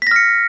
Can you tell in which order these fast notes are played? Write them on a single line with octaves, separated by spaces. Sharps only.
B6 A#6 F6 C#7